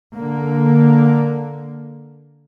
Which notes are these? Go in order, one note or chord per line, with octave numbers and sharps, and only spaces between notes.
D3 A#3